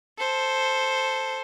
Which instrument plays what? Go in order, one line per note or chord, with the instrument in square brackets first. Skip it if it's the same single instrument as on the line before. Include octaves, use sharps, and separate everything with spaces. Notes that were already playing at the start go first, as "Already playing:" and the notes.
[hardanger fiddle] A4 C5